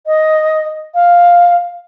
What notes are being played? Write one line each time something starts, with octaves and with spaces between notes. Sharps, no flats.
D#5
F5